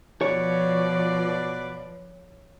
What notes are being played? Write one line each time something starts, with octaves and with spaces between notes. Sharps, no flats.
B2 F3 B4 C#5 D5